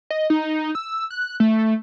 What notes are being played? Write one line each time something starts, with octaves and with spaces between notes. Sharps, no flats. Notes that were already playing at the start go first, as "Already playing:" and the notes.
D#5
D#4
E6
F#6
A3